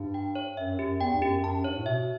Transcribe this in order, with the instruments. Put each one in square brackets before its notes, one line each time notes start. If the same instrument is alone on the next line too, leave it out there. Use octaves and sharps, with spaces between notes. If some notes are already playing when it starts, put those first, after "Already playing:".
Already playing: [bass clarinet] G2 [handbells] G4
[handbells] G5
C#5
[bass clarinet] F#2 [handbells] E5
[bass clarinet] F#2 [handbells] G4
[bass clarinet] E2 [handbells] G5
[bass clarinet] G2
[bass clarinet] F#2 [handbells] G4
[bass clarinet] F#2 [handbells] A5
[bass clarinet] G2 [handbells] C#5
[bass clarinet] A2
[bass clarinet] B2 [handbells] E5